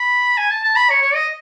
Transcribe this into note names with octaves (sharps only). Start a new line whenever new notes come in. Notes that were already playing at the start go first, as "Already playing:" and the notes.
Already playing: B5
G#5
A5
A5
B5
C#5
C#5
D#5